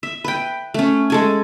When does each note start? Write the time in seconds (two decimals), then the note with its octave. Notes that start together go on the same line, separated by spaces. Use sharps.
0.03 E5
0.24 B4 G5
0.74 A3 C#4
1.10 G#3 A4 G#5